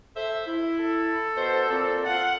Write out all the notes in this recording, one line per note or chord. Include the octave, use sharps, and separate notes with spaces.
A4 C5 E5
E4
A4
B2 C5
A#2 C4
F4 F#5